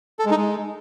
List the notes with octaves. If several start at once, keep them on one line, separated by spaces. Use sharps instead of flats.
A4
G#3
D#4
G#3